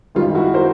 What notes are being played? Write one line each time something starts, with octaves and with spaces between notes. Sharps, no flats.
G#1 F#2 D#3 G3 F4
E4 F#4
A#4 C5